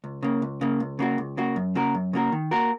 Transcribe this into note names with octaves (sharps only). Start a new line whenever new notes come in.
C#2
C#3 A#3
C#2
C#3 A#3
C#2
C#3 A#3 F#4
C#2
C#3 A#3 F#4
F#2
C#3 A#3 F#4 A#4
F#2
C#3 A#3 F#4 A#4
D#3
A#3 F#4 A#4